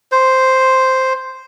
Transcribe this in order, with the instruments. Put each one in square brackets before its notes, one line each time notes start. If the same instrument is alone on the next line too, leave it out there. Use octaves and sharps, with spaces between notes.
[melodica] C5